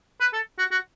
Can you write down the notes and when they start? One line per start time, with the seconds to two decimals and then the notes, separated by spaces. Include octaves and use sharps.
0.21 B4
0.33 A4
0.58 F#4
0.71 F#4